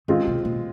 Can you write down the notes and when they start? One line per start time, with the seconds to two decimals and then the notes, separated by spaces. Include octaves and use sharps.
0.08 D#3 G#3 C4 F4
0.27 C3
0.45 A#2